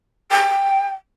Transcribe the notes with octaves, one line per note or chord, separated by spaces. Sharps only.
G5